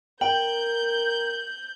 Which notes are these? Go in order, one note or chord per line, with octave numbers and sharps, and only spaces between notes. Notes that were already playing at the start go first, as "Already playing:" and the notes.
A#4 G5 G6 F#7